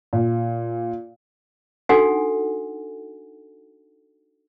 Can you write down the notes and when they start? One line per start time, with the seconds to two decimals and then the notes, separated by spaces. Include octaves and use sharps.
0.13 A#2
1.89 D4 D#4 F#4 A4 F#5 G#5